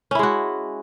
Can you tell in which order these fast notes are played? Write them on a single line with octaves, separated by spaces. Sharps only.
C#4 E4 G#3 F#4